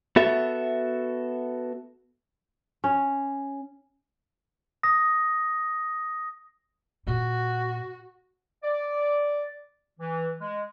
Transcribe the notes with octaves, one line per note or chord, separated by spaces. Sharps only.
B3 F#4 A4 E5
C#4
D#6 A#6
A#2 A#3 F#4
D5
E3
G#3